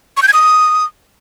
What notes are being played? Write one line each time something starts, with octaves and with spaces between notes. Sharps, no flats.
C#6
G6
G#6
D#6